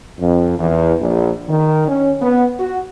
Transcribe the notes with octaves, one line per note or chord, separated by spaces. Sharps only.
F2
E2
A#1
D#3
C#4
B3
F#4